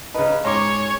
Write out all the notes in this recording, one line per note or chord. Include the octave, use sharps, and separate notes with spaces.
C#3 D#4 B4
G#2 C#4 C#5 A#5 C6 D6